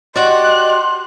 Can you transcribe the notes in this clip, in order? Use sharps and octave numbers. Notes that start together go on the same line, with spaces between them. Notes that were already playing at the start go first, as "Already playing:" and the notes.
F#4 G4 D5 D#5 C6 F#6